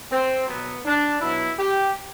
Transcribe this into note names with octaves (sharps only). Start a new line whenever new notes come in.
C4
B2 F#3 B3
D4
B2 F#3 E4
G4